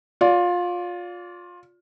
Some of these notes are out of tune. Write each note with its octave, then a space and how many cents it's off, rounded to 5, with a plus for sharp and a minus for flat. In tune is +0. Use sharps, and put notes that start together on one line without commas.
F4 +20 D5 -35